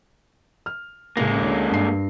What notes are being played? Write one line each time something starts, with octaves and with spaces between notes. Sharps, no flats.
F6
A1 C#3 G#3 A#3 A#6
D2 C#4
G2 C7